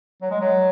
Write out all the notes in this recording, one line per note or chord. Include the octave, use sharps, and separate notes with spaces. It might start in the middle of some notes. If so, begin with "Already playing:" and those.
F#3
G#3
F#3